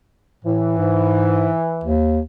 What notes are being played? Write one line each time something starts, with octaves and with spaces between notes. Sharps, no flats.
A2 E3
G#2
D#2